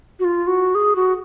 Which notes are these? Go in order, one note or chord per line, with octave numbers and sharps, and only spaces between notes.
F#4
F4
F#4
G#4
F#4